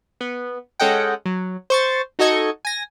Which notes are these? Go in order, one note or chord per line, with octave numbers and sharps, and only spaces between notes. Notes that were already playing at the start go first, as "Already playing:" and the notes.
B3
G#3 C#4 A4 D#5 F#5 G5
F#3
C5 C#6 A6
D#4 F#4 A4 D#5 G#6 C#7
G#5 A#6